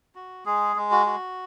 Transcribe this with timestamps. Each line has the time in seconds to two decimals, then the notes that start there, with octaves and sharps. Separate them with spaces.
0.15 F#4
0.46 G#3 G#4
0.76 G#3
0.92 F#4
1.06 F#4